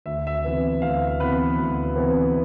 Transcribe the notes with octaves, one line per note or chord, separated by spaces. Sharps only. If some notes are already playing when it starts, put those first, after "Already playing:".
D2 E5
E5
C3 E3 B3
D2 F5
C3 E3 B3 B4 B5
D2
C3 E3 B3